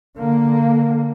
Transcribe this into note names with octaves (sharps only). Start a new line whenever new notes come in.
D3 A#3